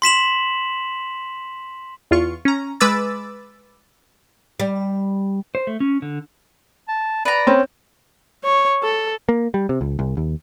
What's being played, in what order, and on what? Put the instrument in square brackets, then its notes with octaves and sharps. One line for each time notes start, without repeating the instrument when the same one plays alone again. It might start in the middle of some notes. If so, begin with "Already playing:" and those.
[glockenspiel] C6 B6 E7 F#7
[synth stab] E2 F4 C#6
C#4 A#5
G#3 B4 B5 D6 E6 A6
[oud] G3
[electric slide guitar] C5
A3
C#4
D3
[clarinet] A5
[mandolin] B4 A#5 [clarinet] D5
[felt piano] C4 C#4
[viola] C#5
A4
[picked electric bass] A#3
G3
C3
C#2
C2
D#2